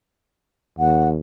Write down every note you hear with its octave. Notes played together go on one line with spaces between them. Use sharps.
D#2 F#5